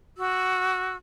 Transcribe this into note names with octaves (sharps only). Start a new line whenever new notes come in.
F#4 E6